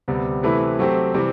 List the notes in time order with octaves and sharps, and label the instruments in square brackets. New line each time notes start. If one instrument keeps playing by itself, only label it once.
[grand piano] D2 C3 G3 B3
C3 E3 A3 E4 B4
F#3 A3 C4 G4 C5
C3 E3 G3 C4